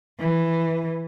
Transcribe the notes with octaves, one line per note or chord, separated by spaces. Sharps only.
E3